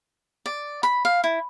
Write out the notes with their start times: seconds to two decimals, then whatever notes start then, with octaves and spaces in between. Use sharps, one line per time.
0.46 D5
0.83 B5
1.05 F5
1.24 E4